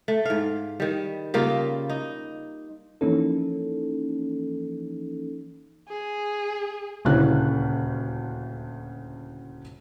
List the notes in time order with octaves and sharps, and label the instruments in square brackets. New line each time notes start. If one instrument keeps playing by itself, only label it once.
[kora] A3
G#2 F5
D#3 G3
C#3 G3 A#3 F4
D#4
[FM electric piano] E3 F3 A#3 C#4 D#4 A4
[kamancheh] G#4
[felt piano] D#1 D2 C#3 C#4 E4 F#6